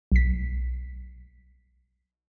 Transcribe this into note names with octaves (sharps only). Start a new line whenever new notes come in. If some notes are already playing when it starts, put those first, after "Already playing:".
B1 B6